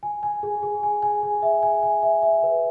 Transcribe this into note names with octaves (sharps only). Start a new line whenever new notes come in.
G#5
G#5
G#4
G#4
G#5
G#5
G#4
E5
G#5
G#5
E5
E5
B4